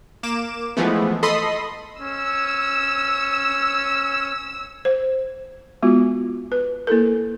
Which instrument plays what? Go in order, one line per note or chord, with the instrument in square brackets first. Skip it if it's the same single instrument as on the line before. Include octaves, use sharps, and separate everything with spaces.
[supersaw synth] A#3 D6 E7
E3 F3 G#3 A3 B3
A4 D#5 B5 C6 D#6
[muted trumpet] C#4 [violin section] E6
[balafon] C5
G#3 B3 F4 F#4
B4
A#3 E4 A4 A#4